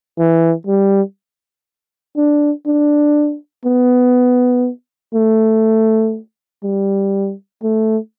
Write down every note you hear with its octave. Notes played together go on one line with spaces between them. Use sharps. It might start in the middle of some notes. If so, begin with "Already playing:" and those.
E3
G3
D4
D4
B3
A3
G3
A3